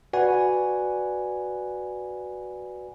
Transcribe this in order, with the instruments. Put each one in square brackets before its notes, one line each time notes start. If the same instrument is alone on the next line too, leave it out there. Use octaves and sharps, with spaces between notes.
[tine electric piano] F#4 B4 D5 F#5 G#5